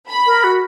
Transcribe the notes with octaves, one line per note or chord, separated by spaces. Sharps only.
B5
A#4
F#4